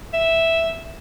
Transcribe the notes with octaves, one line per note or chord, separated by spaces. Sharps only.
E5